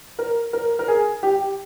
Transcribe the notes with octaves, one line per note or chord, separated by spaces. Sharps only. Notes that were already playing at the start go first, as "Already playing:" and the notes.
A#4
A#4
A#4
G#4
G4